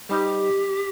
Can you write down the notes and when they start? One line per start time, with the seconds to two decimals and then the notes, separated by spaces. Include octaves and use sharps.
0.09 G3 D#4 G4 C5 D#5